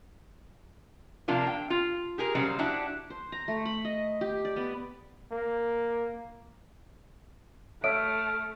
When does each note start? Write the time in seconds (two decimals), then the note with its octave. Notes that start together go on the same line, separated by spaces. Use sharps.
1.28 C3 F3 A#3 D4 F4
1.47 G5
1.70 F4
2.18 G4 G#4 A#4
2.35 C#3 F#3 G3 A#3 C5
2.59 D4 E4 F#4 G4
3.10 C5
3.32 A#5
3.48 A3
3.65 B5
3.85 D#5
4.21 G4
4.45 D5
4.56 B3
5.32 A#3
7.84 A3 C#5 E5 D#6 F6 D7